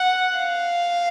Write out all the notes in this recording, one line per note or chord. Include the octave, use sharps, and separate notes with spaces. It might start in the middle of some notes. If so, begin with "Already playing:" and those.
Already playing: F#5
F5